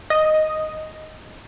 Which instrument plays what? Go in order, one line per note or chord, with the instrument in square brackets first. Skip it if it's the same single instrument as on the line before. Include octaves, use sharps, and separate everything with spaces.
[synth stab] D#5